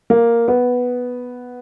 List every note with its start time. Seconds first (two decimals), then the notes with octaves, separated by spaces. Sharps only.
0.10 A#3
0.48 B3